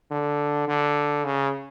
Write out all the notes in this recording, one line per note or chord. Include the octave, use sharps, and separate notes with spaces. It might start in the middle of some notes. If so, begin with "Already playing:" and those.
D3
D3
C#3